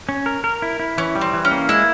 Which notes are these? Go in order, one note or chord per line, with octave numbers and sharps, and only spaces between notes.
C#4
A#4
A#4
E4
E4
E3 C#4
G3
C4
E3
C#4
A#3
G#3 E4